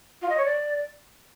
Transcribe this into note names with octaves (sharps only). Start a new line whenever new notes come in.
F4
D#5
C#5
D5